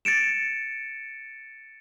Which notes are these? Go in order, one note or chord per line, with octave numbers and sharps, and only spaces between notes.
A6 C#7 D7 E7